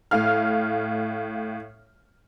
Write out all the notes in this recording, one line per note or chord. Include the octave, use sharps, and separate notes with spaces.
A2 F5 F6